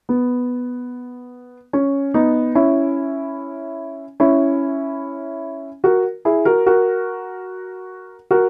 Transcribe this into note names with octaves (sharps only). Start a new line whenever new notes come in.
B3
C#4
B3 D#4
C#4 E4
C#4 E4
F#4 A#4
E4 G#4
F#4 A#4
F#4 A#4
F#4 A#4